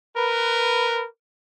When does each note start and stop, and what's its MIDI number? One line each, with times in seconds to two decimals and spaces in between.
0.16 1.06 70
0.16 1.06 71